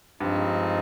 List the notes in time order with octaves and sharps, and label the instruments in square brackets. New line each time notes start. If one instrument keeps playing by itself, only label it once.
[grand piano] G2 [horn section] F3 G#3 C4 D#4